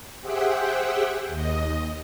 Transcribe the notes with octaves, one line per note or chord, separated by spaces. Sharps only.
G4 G#4 C5 E5 F#5 G5
D#2 D#5